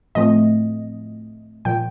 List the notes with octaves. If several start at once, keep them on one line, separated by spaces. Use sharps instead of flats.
A2 F3 A3 C4 D#5
A#2 F3 G5